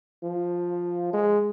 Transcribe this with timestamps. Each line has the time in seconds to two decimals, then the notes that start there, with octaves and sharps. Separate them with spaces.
0.23 F3
1.13 G#3